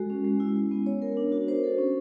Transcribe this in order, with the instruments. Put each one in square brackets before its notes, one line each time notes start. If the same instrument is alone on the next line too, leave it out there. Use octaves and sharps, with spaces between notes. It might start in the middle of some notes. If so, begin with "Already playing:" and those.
Already playing: [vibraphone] G#3 F#4 A4
C#4
G#3
E4
G#3
B3
C#5
A#4
D4
F#4
C5
A4
C#4